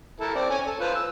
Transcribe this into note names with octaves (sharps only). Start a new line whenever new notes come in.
E4 A4 A#4
C4 D5
C#4 G#5
A4
F4 B4 C5
E6